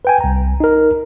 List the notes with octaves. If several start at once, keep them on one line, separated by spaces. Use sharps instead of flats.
B4 G5 G#5
C2 A#5
D#4 A#4